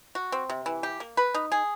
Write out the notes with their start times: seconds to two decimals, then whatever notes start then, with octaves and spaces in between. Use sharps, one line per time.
0.15 F#4
0.32 C4
0.50 C3
0.66 E3
0.83 G4
1.00 A#3
1.17 B4
1.34 D#4
1.52 G#4